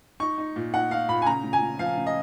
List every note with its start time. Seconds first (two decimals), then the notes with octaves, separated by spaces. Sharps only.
0.20 D#4 C#6
0.38 D#4
0.56 A#2
0.73 D#4 F#5
0.91 D#4 F5
1.09 A#2 B5
1.22 G#5
1.26 C#3 A#5
1.44 C#3
1.53 G#5
1.62 C#3
1.79 F3 F5
1.98 C#3
2.07 D#5